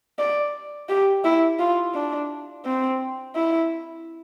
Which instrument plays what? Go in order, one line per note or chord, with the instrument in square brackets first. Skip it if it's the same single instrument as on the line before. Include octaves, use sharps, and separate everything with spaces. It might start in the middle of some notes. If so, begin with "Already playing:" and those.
[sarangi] D5
G4
E4
F4
D4
C4
E4